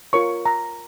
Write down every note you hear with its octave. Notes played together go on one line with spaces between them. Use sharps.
F4 A#4 C#5 C#6
A#5